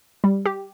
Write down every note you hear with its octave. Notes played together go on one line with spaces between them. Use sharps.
G3
G4